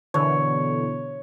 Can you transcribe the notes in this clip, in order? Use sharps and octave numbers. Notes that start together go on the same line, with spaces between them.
B2 D3 E3 C#5